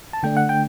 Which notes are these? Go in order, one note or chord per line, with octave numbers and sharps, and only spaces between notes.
A5
D3 A3 D4 G5
F#5
G5